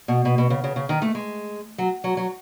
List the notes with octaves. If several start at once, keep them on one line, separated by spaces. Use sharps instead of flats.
B2
B2
B2
C#3
C#3
C#3
D#3
A3
G#3
F#3
F#3
F#3